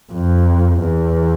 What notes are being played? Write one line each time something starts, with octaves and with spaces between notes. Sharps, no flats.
F2
E2